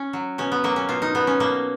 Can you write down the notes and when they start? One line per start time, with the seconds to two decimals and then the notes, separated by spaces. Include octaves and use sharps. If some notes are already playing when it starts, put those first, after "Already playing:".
Already playing: C#4
0.13 F#3
0.38 B2 C#4
0.52 B3
0.64 F#3 A#3
0.76 C#4
0.89 B2 F4
1.02 D#4
1.15 B2 B3
1.27 C#4
1.40 B2 A#3